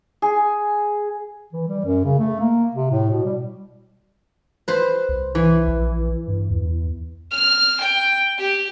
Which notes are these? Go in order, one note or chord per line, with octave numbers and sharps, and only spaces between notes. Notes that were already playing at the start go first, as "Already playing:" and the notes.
G#4
E3
G3
F#2
C#3
A3
A#3
C3
A2
B2
G3
B4 C5
C2
E3
A#1
G2
E2
F6
G5
G4